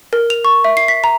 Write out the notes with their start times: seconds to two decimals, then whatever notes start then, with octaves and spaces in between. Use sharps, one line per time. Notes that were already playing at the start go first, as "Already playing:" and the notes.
0.13 A#4
0.30 F7
0.45 C#6
0.64 E5
0.77 C7
0.88 B6
1.04 A#5